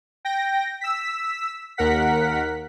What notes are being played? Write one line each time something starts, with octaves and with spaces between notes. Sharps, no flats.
G5 A#6
E6 B6
D#2 A#4 F#5 B6